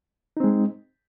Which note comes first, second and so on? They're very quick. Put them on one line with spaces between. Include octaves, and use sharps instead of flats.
D#4 C4 G#3